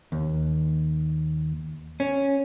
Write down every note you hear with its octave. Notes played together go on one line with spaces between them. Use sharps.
D#2
C#4